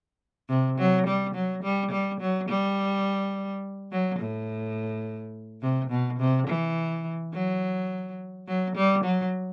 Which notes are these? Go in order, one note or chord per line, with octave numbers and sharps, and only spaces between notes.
C3
F#3
G3
F#3
G3
G3
F#3
G3
F#3
A2
C3
B2
C3
E3
F#3
F#3
G3
F#3